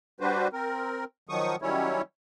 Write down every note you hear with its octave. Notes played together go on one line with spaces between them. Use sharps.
G3 D4 F#4 B4 C5
C4 A#4
D#3 F3 F#3 C#6 D#6
D#3 F#3 G3 C#4 E4 C#5